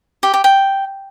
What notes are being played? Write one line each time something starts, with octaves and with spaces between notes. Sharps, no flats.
G4
G4
G5